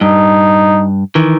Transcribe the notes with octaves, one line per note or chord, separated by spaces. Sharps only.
G2 D#4
D#3 E3